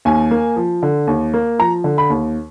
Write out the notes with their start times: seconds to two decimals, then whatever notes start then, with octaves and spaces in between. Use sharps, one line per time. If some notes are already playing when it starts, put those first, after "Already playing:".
0.05 D#2 G#5
0.31 A#3
0.56 F3
0.83 D3
1.07 D#2
1.34 A#3
1.59 F3 A#5
1.84 D3
1.98 B5
2.10 D#2